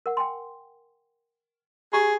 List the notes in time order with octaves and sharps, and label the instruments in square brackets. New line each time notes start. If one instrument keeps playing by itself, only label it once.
[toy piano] A#4 F#5
G5 G#5 C6
[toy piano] G4 A#5 C#6 [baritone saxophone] G#4